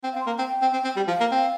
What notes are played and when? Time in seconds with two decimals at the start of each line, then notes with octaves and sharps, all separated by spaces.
0.04 C4 G5
0.13 F5
0.16 C4
0.21 C6
0.26 A#3
0.29 A#5
0.39 C4 G5
0.62 C4
0.73 C4
0.84 C4
0.96 G3
1.07 F3 F5
1.20 A#3
1.32 C4